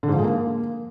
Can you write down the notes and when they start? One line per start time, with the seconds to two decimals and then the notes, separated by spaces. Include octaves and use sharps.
0.03 D3
0.08 G#2
0.13 F3
0.19 G#3
0.24 A#3